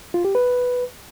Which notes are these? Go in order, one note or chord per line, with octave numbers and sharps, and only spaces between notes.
F4
G4
B4